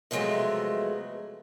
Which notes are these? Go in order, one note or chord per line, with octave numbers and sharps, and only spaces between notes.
C3 F3 F#3 G#3 A3 B3